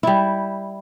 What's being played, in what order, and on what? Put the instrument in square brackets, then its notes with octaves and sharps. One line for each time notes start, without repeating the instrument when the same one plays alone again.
[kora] G3 E4